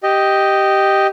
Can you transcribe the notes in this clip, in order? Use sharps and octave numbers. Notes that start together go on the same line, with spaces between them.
G4 D#5